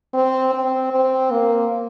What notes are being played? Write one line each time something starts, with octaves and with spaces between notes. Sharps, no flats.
C4
C4
C4
A#3